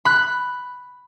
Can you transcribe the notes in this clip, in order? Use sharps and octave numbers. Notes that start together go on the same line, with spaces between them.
B5 F#6